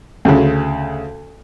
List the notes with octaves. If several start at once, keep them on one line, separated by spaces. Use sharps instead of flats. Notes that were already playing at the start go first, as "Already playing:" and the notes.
D2 C#3